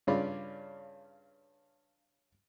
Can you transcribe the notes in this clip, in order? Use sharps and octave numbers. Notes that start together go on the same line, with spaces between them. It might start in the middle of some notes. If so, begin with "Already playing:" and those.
G2 C#3 C#4 F4 D5 B5